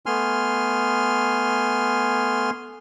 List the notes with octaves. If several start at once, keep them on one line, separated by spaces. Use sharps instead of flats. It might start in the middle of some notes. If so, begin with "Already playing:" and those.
A3 B3 G#5 C6 F6